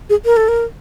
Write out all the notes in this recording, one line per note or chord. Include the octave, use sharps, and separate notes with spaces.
G#4
A#4
A4
A#4